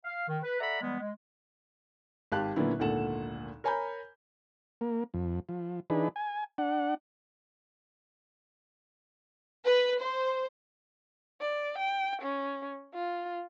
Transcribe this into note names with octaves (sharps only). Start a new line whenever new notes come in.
F5
D#3
B4
A4 D5 E5 F#5 A#5 B5
E3 G3 G#3 B3
G#3
G#1 G4 F5 A5 F#6
A#2 D3 F#3 B3 C#4 E4
G#1 D2 A#2 A4 F#5 E7
A#4 C#5 G#5 A#5 B5 G6
A#3
F2
F3
E3 D4 D#4 G#4 B4
G#5
D4 F#5
B4
C5
D5
G5
C#4
F4